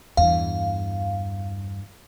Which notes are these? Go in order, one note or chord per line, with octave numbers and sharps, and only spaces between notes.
E2 G2 F5